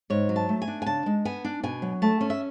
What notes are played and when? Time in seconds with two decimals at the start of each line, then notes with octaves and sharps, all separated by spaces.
0.10 G#2 C#5
0.29 F#3
0.36 A5
0.49 A3
0.62 G#5
0.68 D4
0.82 G#5
0.86 C#3 A5
1.06 G#3
1.25 B3 G#5
1.45 D4
1.63 B2 G#5
1.82 F#3
2.02 A3 A5
2.21 C#4
2.30 E5